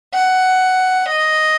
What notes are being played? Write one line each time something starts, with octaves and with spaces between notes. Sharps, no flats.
F#5
D#5